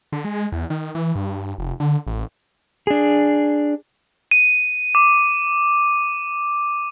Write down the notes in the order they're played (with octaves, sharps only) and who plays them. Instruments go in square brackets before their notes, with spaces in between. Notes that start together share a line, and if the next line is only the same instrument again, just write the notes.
[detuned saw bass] D3
G#3
E2
D#3
E3
G2
F1
D3
A1
[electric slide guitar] D4 G#4
[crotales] D#7
D6